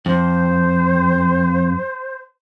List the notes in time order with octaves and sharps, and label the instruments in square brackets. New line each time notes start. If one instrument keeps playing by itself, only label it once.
[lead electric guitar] F2 [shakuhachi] C5